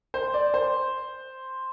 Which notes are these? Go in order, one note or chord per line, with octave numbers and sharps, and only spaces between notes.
C5
D5
C5